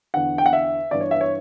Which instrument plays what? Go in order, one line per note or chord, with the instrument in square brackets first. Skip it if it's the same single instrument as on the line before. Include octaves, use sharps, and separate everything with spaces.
[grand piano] E2 D3 F#5
G5
F#5
E5
G2 E3 D5
C#5
E5
C#5